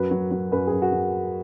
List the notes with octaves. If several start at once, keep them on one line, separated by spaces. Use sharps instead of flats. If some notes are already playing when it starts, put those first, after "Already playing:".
Already playing: F#2 F#3 B4
F#3
F#3
F#2 B4
F#2 G#4
F#4
F#3